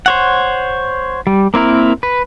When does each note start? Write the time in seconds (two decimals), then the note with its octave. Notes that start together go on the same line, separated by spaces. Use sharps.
0.06 C5 C#5 F#5
1.27 G3
1.54 A#3 C4 E4 A#4
2.03 B4